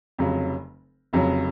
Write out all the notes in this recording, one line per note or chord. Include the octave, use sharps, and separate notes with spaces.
F1 F2 C#3 F#3
F1 F2 C#3 F#3